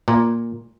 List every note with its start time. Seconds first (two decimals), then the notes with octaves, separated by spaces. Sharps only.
0.08 A#2